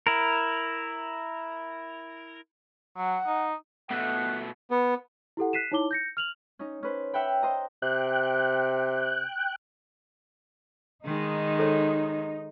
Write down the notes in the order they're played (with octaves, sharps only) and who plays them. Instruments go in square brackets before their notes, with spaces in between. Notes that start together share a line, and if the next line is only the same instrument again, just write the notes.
[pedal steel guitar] E4 A#4
[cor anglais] F#3 [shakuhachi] F#5
[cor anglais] D#4
[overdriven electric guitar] B2 A3 [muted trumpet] F#5
[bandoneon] B3
[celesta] E4 G4 A4 F#5
F#6 B6 C7 D#7 E7
D#4 E4 C#5 A5 D6 G7
G6 A#6 C#7
F6 F7 F#7
[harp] C#4 D#4
C#4 B4 C5
E5 F#5 G5 B5
C5 D#5 A#5
[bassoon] C3 [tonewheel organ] G5 F#6
[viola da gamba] D#3 G#3 [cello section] D#4
[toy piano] A4 C5 C#5